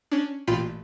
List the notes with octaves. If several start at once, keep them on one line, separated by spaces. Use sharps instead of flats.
C#4 D4
A1 A#2 F4 G5 B5 C6